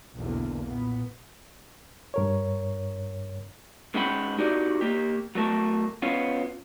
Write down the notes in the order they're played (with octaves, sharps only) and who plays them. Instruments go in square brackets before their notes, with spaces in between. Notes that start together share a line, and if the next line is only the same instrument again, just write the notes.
[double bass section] B1 E2 D3 A#3
A#2 B3
[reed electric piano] G2 A#4 C#5
[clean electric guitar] G#2 G#3 C#4 F#5 G5 B5
D#4 F#4 G4 A#4 D5
A#3 G4
F#3 A3 A#4 A5
B3 C#4 F4